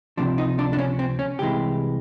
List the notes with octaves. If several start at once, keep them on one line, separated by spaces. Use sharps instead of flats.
C#2 C3 F3 D4
D#4
D4
D4
C#4
C4
C#4
C2 C3 E3 G#3 G4